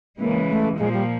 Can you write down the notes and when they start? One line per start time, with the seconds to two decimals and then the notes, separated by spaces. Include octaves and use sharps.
0.20 C#3 E3 G#3 A#3
0.49 A3
0.78 A#2 F3 G#3 A#3
0.92 G3